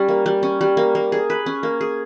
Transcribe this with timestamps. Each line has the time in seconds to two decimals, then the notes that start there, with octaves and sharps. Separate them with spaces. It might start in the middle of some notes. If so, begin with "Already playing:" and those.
Already playing: G3 C#4
0.08 A#3
0.26 G3
0.43 C#4
0.61 G3
0.77 A#3
0.95 A#3
1.12 G#4
1.30 B4
1.46 C#4
1.63 A#3
1.81 G#4